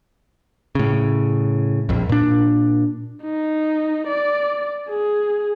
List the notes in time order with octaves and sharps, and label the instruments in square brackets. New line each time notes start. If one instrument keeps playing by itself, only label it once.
[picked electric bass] A2 C#3
A#1 F2
A#2 D4
[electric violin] D#4
D5
G#4